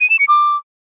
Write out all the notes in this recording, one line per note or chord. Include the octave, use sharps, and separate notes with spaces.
D#7
E7
C#7
D6